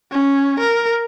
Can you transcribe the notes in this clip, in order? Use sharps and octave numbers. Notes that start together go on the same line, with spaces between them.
C#4
A#4